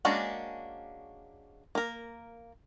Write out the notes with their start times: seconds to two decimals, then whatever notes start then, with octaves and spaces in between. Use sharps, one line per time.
0.05 G#3 A#3 C#4 D4 F#4
1.75 A#3 A#4